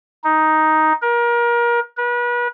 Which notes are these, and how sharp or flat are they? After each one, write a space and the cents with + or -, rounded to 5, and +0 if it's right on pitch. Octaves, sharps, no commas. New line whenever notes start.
D#4 +5
A#4 +30
B4 -35